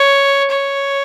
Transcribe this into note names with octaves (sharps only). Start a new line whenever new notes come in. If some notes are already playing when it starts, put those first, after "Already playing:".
Already playing: C#5
C#5